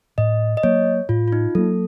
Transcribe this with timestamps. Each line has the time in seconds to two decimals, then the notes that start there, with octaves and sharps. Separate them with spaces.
0.18 A2 D#5
0.57 D#5
0.63 F#3 A#3 C#5
1.09 A2 F4
1.28 F4
1.32 D#4
1.55 F#3 A#3 A4